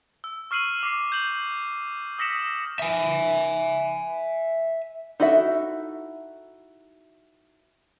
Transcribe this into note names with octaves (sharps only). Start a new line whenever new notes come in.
E6
C#6 F6 C7 D#7 F#7
D6 C7
G6 F#7
D#6 E6 A#6 B6 C#7 E7
E5 G#5
D#4 E4 F#4 A4 E5